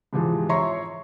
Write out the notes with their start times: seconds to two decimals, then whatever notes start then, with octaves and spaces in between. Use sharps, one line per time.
0.13 G#2 C3 E3 F3 G#3
0.49 C#5 E5 A#5 C6 C#6